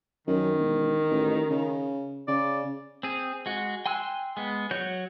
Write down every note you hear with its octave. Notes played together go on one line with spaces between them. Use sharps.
F#2 D#3
E1
A1
C#3
C#3 D5
C4 G#4
G#3 F#4
G5 G#5 C6 E6 F#6
G#3 B3
F#3 F#4 C#5 G6